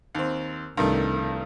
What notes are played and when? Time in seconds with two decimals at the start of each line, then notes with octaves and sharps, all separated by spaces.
0.15 D#2 C4
0.77 C2 G2 D#3 A3